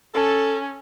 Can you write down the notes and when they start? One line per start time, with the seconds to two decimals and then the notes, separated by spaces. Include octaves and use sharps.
0.15 C#4 A4